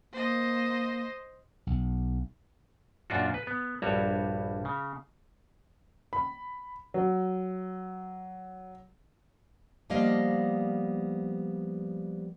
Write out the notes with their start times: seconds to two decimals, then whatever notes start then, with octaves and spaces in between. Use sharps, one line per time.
0.13 A#3 C5 D#5
1.67 B1
3.10 F#2 A#2 D4 F4 F#4
3.34 B4
3.47 B3
3.82 A#1 G2 G3 F#4 C#5
4.65 C#3
6.13 B5
6.94 F#3
9.90 F3 G3 A#3 B3 D#5 F5